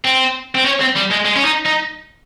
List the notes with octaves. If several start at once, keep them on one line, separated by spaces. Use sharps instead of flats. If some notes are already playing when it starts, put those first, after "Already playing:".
C4
C4
C#4
C4
G3
G#3
G#3
C#4
D#4
D#4